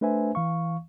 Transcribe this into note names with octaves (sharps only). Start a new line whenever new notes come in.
A3 D4 B4 C5 E5 G#5
E3 F5 C#6